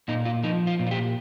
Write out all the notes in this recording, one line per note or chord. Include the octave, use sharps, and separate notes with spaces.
A#2 D#4
F4
F3 D#4
F4
A#2
F4
G4